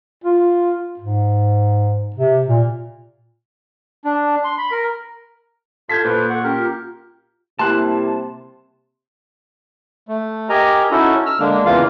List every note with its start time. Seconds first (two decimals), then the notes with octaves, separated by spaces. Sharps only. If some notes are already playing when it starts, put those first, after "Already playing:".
0.24 F4
0.99 G#2
2.16 C3
2.48 A#2
4.05 D4
4.44 C6
4.58 B5
4.72 A#4
5.89 F4 A4 F5 A5 G6 G#6 B6
6.04 A#2 B4 C5
6.30 F#5 C#6
6.43 C#4 G4 A#4
6.58 F4
7.59 C3 G3 A#3 E4 A5 C6 F#6
10.08 A3
10.49 G4 A#4 D#5 G#5 A#5
10.91 C#4 D#4 E4 F#4 A4
11.26 E6 F6
11.40 D3 G#3 A#3 D4
11.65 E2 C#3 E3 A#3 F4 F5